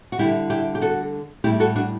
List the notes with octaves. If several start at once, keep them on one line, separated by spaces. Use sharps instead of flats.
F#4
D3 G3 E4 G4
E4 G4
G4
F#4 A4
A2 G3 E4 G4
F#4 A4
D4 F#4